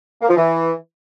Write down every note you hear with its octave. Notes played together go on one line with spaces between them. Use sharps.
A#3
F3
E3